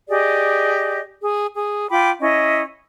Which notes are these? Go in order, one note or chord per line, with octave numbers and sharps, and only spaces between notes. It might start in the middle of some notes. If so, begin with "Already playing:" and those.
G4 G#4 D5 D#5
G#4
G#4
F4 G5 B5 D6
C#4 E4 D#5